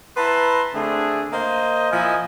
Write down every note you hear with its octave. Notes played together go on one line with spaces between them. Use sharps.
E4 B4 A5 A#5 C6
D3 A3 C4 D4 G#4
A#3 C5 D#5
A#2 F3 E4 D#5 G#5